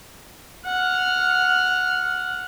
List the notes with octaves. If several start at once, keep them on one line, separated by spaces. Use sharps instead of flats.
F#5 F6